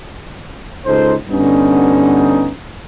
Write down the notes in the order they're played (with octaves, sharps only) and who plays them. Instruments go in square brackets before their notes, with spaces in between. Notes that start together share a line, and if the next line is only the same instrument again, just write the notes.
[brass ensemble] C#2 D#4 A4 C5
G2 D3 B3 C#4 D#4